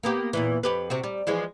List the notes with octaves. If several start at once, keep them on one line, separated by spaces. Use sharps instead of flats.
A#3 B3 G4
E2 A#2 E3
F2 G4 B4
C3 C4 F#4
G3
E3 F3 G#3